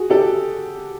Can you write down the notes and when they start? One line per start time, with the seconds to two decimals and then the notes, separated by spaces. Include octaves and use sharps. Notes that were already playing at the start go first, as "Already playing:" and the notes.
Already playing: F#4 G#4
0.10 G4 A4